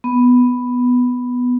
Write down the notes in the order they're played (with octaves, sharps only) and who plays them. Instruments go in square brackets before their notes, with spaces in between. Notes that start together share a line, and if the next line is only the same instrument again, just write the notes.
[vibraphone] B3